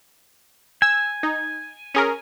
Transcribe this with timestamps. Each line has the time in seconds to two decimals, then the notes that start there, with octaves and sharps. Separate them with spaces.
0.82 G#5 E6
1.23 D#4
1.94 C#4 G#4 A#4